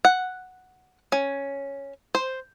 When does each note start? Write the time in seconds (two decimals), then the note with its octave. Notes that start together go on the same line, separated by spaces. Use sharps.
0.05 F#5
1.12 C#4
2.15 C5